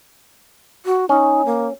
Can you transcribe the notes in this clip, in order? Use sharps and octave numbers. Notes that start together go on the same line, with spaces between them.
F#4
C#4 D#4
A#3